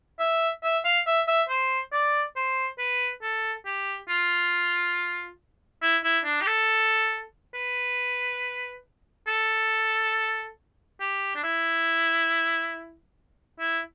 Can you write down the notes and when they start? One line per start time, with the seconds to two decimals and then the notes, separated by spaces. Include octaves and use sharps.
0.19 E5
0.63 E5
0.84 F5
1.06 E5
1.27 E5
1.49 C5
1.92 D5
2.36 C5
2.78 B4
3.22 A4
3.66 G4
4.09 F4
5.82 E4
6.04 E4
6.24 D4
6.41 G4
6.47 A4
7.54 B4
9.27 A4
11.01 G4
11.35 D4
11.43 E4
13.59 E4